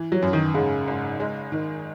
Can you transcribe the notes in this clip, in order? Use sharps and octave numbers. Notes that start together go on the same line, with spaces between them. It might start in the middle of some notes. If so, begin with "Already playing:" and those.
Already playing: E3
F#3
F#2
D#3
G#2 C#3
G#1
G#3
D#3